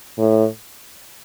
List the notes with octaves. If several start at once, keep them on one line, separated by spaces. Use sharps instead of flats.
A2